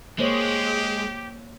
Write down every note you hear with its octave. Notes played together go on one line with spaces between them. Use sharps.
G#3 A#3 G4 C5 C#5